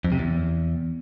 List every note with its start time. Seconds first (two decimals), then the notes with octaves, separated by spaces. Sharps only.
0.05 F2
0.12 C3
0.19 E2